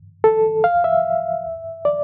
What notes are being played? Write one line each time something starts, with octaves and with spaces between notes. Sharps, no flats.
A4
F5
E5
D5